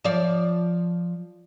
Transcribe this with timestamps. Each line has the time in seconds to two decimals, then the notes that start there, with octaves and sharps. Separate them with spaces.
0.04 F3 D5